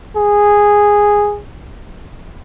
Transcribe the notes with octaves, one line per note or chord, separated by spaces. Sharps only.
G#4